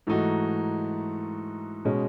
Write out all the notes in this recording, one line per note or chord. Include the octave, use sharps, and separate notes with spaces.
G#2 E3 A3 D#4 F#4
B2 G#3 C#4